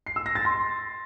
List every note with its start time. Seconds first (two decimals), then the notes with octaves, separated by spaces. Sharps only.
0.07 C7
0.16 E6
0.26 A#6
0.35 A6
0.45 C6